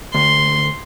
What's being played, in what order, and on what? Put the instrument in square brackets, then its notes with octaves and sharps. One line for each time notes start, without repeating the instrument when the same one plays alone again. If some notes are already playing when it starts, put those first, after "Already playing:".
[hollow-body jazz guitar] D2 [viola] C6